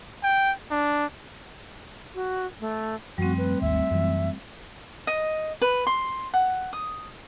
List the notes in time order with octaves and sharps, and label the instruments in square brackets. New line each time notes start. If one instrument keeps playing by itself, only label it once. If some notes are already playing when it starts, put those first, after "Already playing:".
[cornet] G5
D4
[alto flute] F#4
A3
[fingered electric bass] F#2 F3 [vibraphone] G3 A3 C4 [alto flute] F#4
[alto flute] B4
[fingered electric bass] G#1 D#2 [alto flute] E5
[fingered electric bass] F#2 E3
[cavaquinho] D#5
B4
C6
F#5
D#6